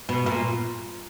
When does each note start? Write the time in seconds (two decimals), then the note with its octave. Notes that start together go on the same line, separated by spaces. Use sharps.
0.09 B2
0.26 A#2